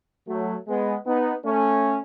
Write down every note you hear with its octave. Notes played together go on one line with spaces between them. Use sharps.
F#3 A3
G#3 B3
B3 D#4
A3 C#4